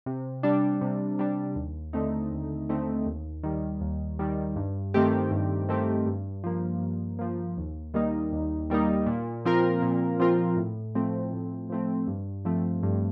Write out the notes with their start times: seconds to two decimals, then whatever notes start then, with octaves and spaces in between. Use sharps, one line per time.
0.06 C3
0.43 G3 D4
0.81 C3
1.19 G3 D4
1.56 D#2
1.93 D3 A3 C4 D#4
2.32 D#2
2.69 D3 A3 C4 D#4
3.06 D#2
3.43 D#3 G3
3.81 D#2
4.19 D#3 G3
4.56 G2
4.94 D#3 A3 C4 G4
5.31 G2
5.69 D#3 A3 C4 G4
6.06 G2
6.44 F3 A#3
6.82 G2
7.19 F3 A#3
7.58 D#2
7.94 D#3 G3 A#3 D#4
8.32 D#2
8.70 D#3 G3 A#3 D#4
9.06 A#2
9.45 F3 C4 F4 A#4
9.82 A#2
10.19 F3 C4 F4 A#4
10.57 A2
10.95 F3 A3 C4
11.33 A2
11.70 F3 A3 C4
12.07 G2
12.45 F3 A3 C4
12.83 G2